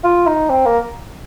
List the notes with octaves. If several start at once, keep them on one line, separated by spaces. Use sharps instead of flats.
F4
D#4
C4
A#3